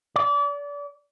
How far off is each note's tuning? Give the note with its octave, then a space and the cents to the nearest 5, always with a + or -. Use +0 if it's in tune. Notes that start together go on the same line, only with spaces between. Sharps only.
D5 -30